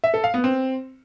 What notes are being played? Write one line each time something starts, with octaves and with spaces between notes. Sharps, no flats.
E5
A4
F5
B3
C4